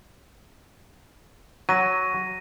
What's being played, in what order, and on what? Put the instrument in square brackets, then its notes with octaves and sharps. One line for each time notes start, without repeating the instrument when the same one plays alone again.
[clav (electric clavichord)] F#3 [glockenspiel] A#6 D#7